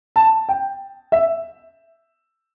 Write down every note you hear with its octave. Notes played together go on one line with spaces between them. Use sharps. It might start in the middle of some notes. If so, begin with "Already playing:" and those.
A5
G5
E5